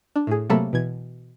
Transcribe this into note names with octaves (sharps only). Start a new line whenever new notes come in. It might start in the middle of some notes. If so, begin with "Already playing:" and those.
D4
A2 G#4
C3 F#3 A3 A#3 A4 B5
B2 E3 G#6